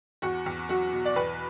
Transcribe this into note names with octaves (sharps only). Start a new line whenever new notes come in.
E2 F#4
E2
F#3 F#4
B2
D5
E2 B4